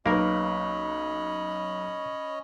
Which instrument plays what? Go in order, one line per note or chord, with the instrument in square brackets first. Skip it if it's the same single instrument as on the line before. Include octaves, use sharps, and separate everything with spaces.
[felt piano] B1 B4 [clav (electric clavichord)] A#3 A#4 [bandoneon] C#4 C#5 D#5 [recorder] B5